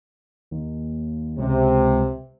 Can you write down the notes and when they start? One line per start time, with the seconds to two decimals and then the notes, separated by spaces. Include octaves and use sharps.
0.51 D#2
1.38 C#2 C3